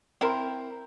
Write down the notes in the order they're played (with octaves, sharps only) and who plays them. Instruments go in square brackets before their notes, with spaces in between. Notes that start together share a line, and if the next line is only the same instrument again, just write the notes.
[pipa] C4 E4 A#4 [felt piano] G5 C6